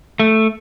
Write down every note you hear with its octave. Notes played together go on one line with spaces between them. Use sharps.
A3